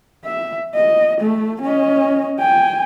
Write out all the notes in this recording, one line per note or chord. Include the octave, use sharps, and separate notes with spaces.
E5
D#5
A3
C#4 D#5
G5 G#5